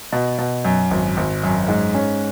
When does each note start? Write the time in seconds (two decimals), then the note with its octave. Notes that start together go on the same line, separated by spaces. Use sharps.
0.12 B2
0.38 B2
0.65 F#2
0.91 G#1
1.17 G#1
1.43 F#2
1.68 G#2
1.95 C#4